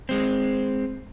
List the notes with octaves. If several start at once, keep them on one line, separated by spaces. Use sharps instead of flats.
G#3 C4